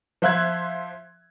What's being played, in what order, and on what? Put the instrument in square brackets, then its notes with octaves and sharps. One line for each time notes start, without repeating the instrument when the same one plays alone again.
[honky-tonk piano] F3 C5 E5 F#6 G#6